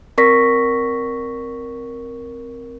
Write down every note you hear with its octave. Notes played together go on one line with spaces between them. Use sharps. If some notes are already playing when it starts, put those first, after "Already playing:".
C4 A#4 D5 C#6 A#6 B6